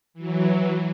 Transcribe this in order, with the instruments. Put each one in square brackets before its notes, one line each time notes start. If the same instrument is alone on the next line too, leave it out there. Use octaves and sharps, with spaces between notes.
[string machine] E3 F#3